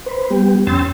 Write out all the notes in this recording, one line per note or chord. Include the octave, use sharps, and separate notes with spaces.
B4 C5
G3 B3 G4
F2 C#4 G5 C6 E6 A6